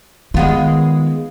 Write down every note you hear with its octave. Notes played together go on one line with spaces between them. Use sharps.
D#3 G#3 B3 F4